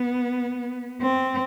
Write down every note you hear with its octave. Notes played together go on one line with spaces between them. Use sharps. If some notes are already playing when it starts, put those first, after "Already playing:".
Already playing: B3
C4